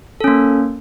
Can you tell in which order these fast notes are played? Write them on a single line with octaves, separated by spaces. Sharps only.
A4 C#4 A#3